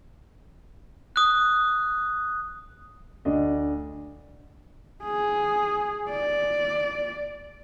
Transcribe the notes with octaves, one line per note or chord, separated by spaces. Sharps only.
D#6 F#6
D2 D4 D#5
G#4
D5